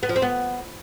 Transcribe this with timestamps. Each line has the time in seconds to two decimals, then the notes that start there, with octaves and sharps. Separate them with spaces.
0.03 B3
0.09 F3
0.16 C4
0.22 B3